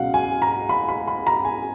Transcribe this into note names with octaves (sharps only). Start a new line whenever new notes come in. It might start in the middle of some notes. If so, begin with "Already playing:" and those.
Already playing: C#2 B2 F#3 F5 F#5
G#5
A#5
B5
B5
B5
A#5
G#5